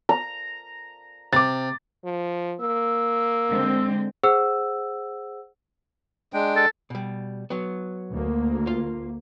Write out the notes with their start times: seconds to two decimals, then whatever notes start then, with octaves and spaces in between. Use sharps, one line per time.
0.09 A#5
1.33 C3 D6 A6
2.04 F3
2.60 A#3 E6
3.49 D3 G#3 C4
4.23 G#4 C5 F#5 E6
6.33 G#3 D4 G5
6.56 A4
6.90 B2 G3
7.50 F#3 B3
8.10 D2 A#3
8.67 F4 F5